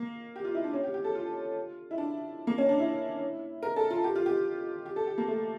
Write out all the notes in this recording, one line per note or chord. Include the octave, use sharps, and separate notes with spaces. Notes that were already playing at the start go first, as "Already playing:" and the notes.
Already playing: A#3
G4
F4
E4
D4
C#4
G4
G4
A4
F4
E4
D4
A#3
C#4
D4
E4
A#4
A4
F4
G4
F4
G4
G4
A4
G4
A#3
A3